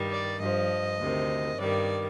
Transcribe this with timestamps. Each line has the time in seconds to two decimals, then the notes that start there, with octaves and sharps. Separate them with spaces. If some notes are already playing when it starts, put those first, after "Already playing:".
Already playing: G2 D#3 G3
0.10 D5
0.40 G2 F3 D#5
0.99 D2 C3 D#3
1.58 G2 D#3 G3 D5